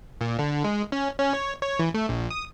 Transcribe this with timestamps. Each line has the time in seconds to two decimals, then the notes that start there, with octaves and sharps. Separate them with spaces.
0.21 A#2
0.39 D3
0.64 G#3
0.92 C#4
1.18 C#4
1.33 C#5
1.62 C#5
1.79 E3
1.94 A3
2.09 A#1
2.31 D#6